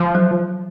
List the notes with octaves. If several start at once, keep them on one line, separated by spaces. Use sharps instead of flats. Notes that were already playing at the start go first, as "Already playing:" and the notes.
Already playing: F3
F#3